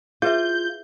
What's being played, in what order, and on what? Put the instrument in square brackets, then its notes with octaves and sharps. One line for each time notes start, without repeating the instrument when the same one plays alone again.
[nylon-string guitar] F4 [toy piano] G#4 B4 E5 [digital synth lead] G6